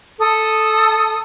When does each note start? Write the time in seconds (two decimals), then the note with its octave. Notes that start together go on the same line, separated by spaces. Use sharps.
0.19 A4 D#6